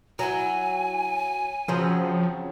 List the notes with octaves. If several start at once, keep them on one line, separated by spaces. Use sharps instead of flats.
F#3 E4 G#5
C#3 F3 F#3 C4